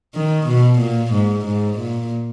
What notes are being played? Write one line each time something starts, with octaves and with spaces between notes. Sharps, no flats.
D#3
B2
A#2
G#2
G#2
A#2